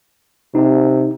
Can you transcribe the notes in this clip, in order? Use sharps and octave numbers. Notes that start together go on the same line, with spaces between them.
C3 D#4